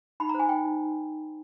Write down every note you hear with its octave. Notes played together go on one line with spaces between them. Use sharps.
D#4 B5
A#5
C5 G#5
D#4 G5
D#4